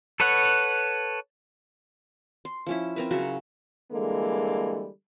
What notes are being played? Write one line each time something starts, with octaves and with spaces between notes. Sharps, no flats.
A4 B4 C#5 F#5
C6
F3 C#4 E4
C4 A#4 B4
C#3 F#3 F#4 E5
D3 E3 G3 G#3 A#3 A4